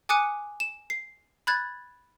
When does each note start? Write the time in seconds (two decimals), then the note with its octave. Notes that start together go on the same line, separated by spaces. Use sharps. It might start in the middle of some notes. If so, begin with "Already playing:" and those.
0.09 G#5 D6 D#6 F#6 C#7 D#7
0.60 E7
0.90 C7
1.47 B5 F#6 G#6 A6